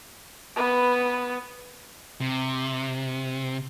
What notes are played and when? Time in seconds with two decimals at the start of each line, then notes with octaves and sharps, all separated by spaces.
0.56 B3 B4
2.21 C3